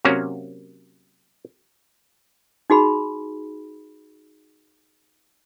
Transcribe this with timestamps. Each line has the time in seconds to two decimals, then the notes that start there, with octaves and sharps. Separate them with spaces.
0.05 C3 F#3 A#3 C#4
2.70 D#4 F#4 G#4 B5